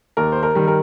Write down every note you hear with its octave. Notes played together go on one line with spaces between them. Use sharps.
D#2 A#4
C5
A#4
D#3 G3
A#4